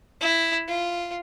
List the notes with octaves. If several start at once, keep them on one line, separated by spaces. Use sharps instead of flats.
E4
F4